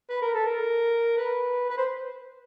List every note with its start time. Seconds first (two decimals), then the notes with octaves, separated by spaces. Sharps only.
0.09 B4
0.22 A#4
0.34 A4
0.46 A#4
1.17 B4
1.70 B4
1.77 C5